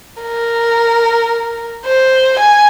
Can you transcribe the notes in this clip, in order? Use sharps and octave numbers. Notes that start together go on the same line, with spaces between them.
A#4
C5
G#5